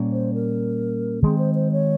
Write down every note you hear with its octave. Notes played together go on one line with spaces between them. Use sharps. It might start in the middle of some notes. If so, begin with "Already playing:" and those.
Already playing: A#2 G3 A#3 C#4
C5
A#4
D#3 G#3 C4 G#4
C5
C5
C#5